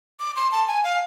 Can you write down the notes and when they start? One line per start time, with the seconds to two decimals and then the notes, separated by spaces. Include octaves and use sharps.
0.20 D6
0.36 C6
0.52 A5
0.67 G#5
0.84 F5